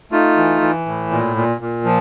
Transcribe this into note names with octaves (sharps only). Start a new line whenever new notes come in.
A3 D#4 F4
E3
E3
A2
A#2
A#2
A#2
F3